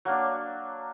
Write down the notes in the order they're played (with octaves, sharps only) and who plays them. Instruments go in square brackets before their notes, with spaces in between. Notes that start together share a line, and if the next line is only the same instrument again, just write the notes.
[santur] F#3 A#3 D4